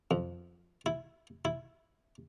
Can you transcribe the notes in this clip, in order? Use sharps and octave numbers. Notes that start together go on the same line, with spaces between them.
F2
E4
E4